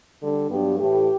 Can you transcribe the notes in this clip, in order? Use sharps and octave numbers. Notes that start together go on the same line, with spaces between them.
D3 G3 D4 A4
G2 F#3 B3 D4 G4
A2 E3 A3 G4